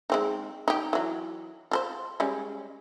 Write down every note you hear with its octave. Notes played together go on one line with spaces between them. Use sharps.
G#3 C4 D#4
D#4 G4
E3 F#3
F4 A4 C5
G3 G#3 C#4